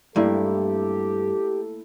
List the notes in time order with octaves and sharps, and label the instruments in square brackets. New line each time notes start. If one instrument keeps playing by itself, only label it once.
[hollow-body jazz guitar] G2 [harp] A3 A#3 E4 [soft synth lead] G4 [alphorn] A4